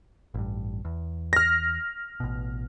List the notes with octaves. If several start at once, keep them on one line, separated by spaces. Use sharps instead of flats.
A1 G2
E2
F6 A#6
A1 B2